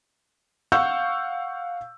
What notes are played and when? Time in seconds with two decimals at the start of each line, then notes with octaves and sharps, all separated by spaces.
0.72 F5 F#5 C#6 E6 G6